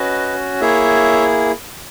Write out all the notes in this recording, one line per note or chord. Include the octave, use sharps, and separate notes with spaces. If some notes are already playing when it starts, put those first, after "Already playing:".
Already playing: C#4 F#4 B4 D#5
A#3 E4 G#4 C#5 E5